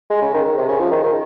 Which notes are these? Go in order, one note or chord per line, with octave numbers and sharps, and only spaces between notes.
G#3
C#3
D#3
D#3
C3
C#3
F3
D#3
D#3